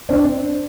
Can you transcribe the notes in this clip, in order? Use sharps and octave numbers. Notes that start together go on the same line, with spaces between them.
C4 D4